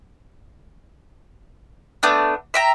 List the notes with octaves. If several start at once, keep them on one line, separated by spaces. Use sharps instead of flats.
A3 B3 D4
E5 G5 A#5